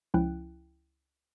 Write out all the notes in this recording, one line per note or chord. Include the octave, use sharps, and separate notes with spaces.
C#2 F3 C#4 E4 G5 F#6